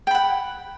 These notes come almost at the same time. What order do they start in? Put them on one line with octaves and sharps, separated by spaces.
G5 B5 F#5